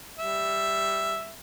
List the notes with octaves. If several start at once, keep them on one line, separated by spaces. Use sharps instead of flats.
G3 E5